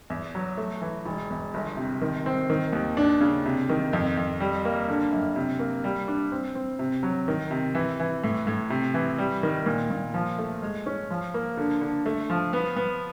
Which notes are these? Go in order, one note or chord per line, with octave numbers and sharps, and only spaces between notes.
E2
F#3
A3
E3
E1
E2
G1
C3
D#3
C4
D#3
D#2
D4
C#3
C3
D#3
F2
F2
G3
A#3
D3
F#2
C3
A#3
G3
D4
C4
C4
C3
F#3
D#3
C3
E3
E3
A2
A2
C3
E3
G3
D#3
A#2
A#2
F3
A3
G#3
C#4
F3
A#3
D3
D3
A3
F3
B3
B3